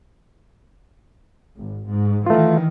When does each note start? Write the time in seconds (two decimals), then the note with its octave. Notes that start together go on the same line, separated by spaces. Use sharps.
1.57 G#1
1.89 G#2
2.26 D#3 E3 A3 F4